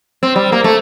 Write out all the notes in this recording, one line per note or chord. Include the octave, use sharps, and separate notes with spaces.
C4
G3
A#3
A3